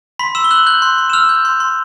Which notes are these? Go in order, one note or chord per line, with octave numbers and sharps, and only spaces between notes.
B5 C6 B6
C6 E6 E7
G7
E6 F#6 F#7
F#6 G6 F#7
C6
C6
E7
E6 F6 F7
G6
C6
C6